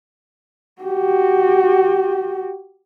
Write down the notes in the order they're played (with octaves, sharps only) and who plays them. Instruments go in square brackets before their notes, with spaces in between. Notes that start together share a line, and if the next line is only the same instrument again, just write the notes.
[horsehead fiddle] F#4 G4